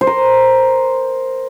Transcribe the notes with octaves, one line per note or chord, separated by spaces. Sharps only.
C5
A#4